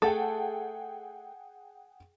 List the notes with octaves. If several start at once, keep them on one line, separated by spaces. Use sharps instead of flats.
A3 G#4 A4 F#5 G5